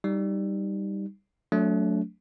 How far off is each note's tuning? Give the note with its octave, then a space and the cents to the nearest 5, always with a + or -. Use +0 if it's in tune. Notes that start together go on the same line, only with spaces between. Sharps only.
G3 +0 D#4 +0
F#3 -5 A3 +0 D4 -40